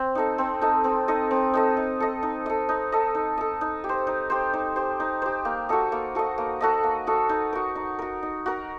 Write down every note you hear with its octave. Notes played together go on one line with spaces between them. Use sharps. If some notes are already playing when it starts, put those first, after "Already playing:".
Already playing: C4
D#4 A4 D#5
C4
D#4 A4 D#5
C4
D#4 A4 D#5
C4
D#4 A4 D#5
D#4
A4 D#5
D#4
A4 D#5
D#4
A4 D#5
D#4
A4 D#5
D#4
G4
C5
D#4
G4 C5
D#4
G4 C5
D#4
G4 C5
A#3
F#4 A4 D#5
A#3
F#4 A4 D#5
A#3
F#4 A4 D#5
A#3
F#4 A4 D#5
D#4
F#4 A#4
D#4
F#4 A#4
D#4
F#4 A#4